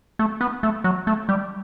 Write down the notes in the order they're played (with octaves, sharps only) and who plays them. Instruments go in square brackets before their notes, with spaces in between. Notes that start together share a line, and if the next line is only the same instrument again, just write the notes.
[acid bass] A3
B3
A3
F#3
A3
G3